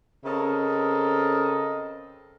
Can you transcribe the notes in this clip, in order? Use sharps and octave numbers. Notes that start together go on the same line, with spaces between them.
C#3 C4 A4 A#4 D#5